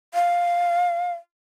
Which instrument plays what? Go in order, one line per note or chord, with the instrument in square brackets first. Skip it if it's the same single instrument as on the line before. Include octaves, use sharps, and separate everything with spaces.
[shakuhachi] F5